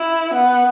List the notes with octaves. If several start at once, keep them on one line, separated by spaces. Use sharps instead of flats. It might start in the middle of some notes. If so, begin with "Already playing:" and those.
Already playing: E4
B3